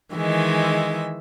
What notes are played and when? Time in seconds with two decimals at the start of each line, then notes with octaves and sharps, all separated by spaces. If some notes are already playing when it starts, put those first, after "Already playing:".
0.13 D#3 E3 G#3 E5